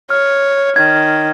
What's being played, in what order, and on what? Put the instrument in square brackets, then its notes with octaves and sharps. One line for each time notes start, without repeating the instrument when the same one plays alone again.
[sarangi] C#5 [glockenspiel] F6
[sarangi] D#3 [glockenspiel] G#6